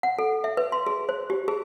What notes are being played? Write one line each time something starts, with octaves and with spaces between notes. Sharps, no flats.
F#5
A4
E5
B4
C6
G#4
C5
G4
G#4